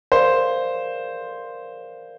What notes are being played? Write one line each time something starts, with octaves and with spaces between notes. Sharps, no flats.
A#4 C5 D5 F5